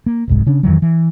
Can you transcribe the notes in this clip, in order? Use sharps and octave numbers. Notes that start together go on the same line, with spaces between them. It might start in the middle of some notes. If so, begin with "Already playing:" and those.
A#3
E1 C2 G#2
C#3 C#4 D4
F2 D#3 E3 F#3
E3